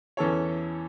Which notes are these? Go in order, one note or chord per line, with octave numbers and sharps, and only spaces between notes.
E2 E3 C#4 A4 C#5